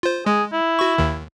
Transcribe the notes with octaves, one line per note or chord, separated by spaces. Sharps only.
F4 C5
G#3 G#4
E4
F#4 C#6
D#2 D#3